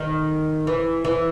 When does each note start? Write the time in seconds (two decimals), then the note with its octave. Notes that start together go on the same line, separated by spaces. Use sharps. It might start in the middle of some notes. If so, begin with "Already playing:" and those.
Already playing: D#3
0.67 E3
1.05 E3